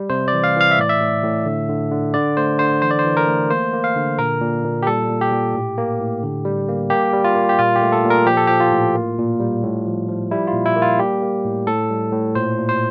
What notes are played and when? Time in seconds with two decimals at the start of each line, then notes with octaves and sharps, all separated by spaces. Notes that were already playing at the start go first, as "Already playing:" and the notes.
Already playing: G3
0.10 C3 C5
0.28 D5
0.33 E3
0.44 F5
0.56 E3 F5
0.71 E5
0.78 A2 D5
0.89 E5
1.01 A2
1.24 A2
1.46 D3
1.69 D3
1.91 D3
2.14 D3 D5
2.37 A3 C5
2.59 D3 C5
2.82 E3 C5
2.91 D5
2.99 C5
3.05 E3
3.17 A#4
3.28 A3
3.50 A#3 C5
3.73 A#3
3.84 F5
3.96 D3
4.19 A#2 A#4
4.41 A#2
4.64 A#2
4.83 G4
4.87 G3 A4
5.10 A#2
5.21 G4
5.32 A#2
5.55 A2
5.78 A#3
6.00 A2
6.23 D3
6.45 G3
6.68 A#3
6.90 A#3 G4
7.13 G3
7.24 F4
7.35 A#3
7.49 G4
7.59 A#2 F4
7.76 G4
7.82 A3
7.92 A4
8.04 A#2
8.10 A#4
8.26 F3 G4
8.37 A4
8.47 F3 G4
8.60 F4
8.72 A2
8.95 A#3
9.18 A#2
9.40 G3
9.63 A2
9.86 F3
10.09 F3
10.31 G3 E4
10.47 F4
10.53 A#2
10.66 E4
10.76 A#3
10.82 F4
10.98 G3 G4
11.22 A#3
11.45 A2
11.67 A2 A4
11.90 G3
12.13 A2
12.35 A#2 C5
12.58 A#2
12.69 C5